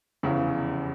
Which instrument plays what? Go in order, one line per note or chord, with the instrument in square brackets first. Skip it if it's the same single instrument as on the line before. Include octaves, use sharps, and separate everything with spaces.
[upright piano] F1 E2 C#3 E3